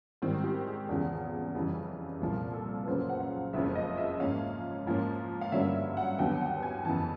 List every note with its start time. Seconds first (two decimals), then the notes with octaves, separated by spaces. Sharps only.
0.22 G#2 D#3 G3 C4
0.44 G4
0.67 G#4
0.89 E2 C#3 F3
1.55 F2 C#3 E3 G3
2.21 C2 A#2 F3 A#3
2.54 A4
2.83 B4
2.88 F#2 C#3 F3 A#3 C5
3.09 F#5
3.20 F5
3.53 F#1 F2 C#3 F3 G#3 E5
3.76 D#5
3.97 E5
4.20 G#2 F3 A#3 C#4 F5
4.86 G#2 F3 A#3 C#4
5.41 F5
5.52 G2 D3 F#3 A#3 C#4 E5
5.74 E5
5.97 F#5
6.19 D#2 D3 F#3 B3 G5
6.41 F#5
6.63 G#5
6.85 F2 C#3 E3 A5